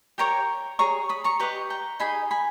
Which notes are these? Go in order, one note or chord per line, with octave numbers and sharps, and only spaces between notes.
G4 A#4 C#5 G5 A#5
G#4 C#5 A#5 C#6
B5 D#6
A#5 C#6
G4 B4 D#5 A#5 C#6
G5 A#5
D#4 G#4 D#5 G#5 B5
G#5 B5